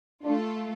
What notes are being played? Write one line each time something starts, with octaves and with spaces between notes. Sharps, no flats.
A3 D4 F4 A4